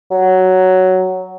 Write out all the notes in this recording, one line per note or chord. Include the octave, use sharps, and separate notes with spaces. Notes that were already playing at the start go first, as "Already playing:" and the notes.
F#3